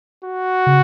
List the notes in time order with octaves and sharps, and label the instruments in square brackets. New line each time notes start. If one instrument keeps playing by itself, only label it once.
[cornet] F#4
[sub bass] C#3